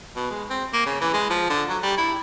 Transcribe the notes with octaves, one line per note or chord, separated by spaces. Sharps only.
B2
G#3
C4
A#3
C#3
E3
G#3
F3
D3
F#3
G3
E4